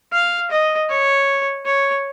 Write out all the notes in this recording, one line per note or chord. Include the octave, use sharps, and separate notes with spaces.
F5
D#5
C#5
C#5